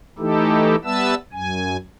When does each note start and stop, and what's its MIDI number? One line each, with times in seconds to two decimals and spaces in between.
0.19 0.76 52
0.19 0.76 57
0.19 0.76 63
0.19 0.76 64
0.19 0.76 67
0.19 0.76 69
0.84 1.15 55
0.84 1.15 59
0.84 1.15 71
0.84 1.15 76
0.84 1.15 81
0.84 1.15 88
1.33 1.77 42
1.33 1.77 80